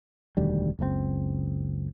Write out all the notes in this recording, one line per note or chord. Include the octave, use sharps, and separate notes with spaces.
E1 D2 D#3 G3
F#1 C#2 B2 C4